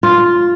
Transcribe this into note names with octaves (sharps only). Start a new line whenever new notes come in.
F4